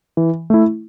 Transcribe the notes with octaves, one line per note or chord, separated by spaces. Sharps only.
E3
A3 E4